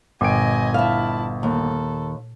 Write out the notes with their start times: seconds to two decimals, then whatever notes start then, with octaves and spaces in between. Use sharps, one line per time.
0.21 G1 A#2 D#5 G5 G#5 D7
0.74 E4 E5 F5 A5
1.43 D#2 A4